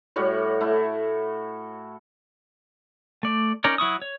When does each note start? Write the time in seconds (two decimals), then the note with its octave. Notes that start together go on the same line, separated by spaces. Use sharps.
0.16 A2 G3 F#4 C#5
0.60 A3 E4
3.23 A3 D5
3.64 C#4 D#4 A#4 C#5 D5
3.78 F#3 E4 C#6 D#6
4.02 C#5